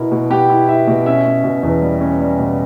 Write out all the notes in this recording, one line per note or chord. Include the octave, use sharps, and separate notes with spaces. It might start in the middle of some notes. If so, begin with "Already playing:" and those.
Already playing: B2 B3 E4 A#4
B2
B3 G4 G5
E4
E4 E5
B2
C#4 E5
C#4
B2
E2
G3
C#4
G3
B2